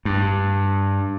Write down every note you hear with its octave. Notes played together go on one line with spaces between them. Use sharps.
G2